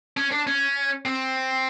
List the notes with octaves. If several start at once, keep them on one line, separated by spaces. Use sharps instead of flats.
C#4
D4
C#4
C4